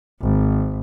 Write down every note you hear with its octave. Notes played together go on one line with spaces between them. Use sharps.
G#1